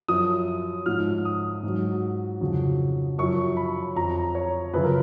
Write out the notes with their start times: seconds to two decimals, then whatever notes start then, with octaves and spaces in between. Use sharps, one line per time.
0.08 F#2 F3 D#6
0.86 G#2 F3 F6
1.25 D#6
1.63 G#2 F#3
2.41 F2 C#3 F#3
3.18 F#2 F3 C#6
3.57 B5
3.96 F2 F3 A#5
4.35 C#5
4.74 F#2 C#3 F3 B4
4.84 A#4